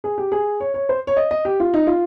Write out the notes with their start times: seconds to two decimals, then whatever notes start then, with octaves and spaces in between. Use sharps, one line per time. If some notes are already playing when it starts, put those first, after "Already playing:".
0.04 G#4
0.18 G4
0.32 G#4
0.60 C#5
0.74 C#5
0.89 C5
1.07 C#5
1.17 D#5
1.31 D#5
1.45 G4
1.60 F4
1.74 D#4
1.87 F4